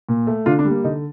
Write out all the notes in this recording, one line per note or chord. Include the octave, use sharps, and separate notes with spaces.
A#2
A3
D3 D4 F4
D4
G3
A#3
D3 D#4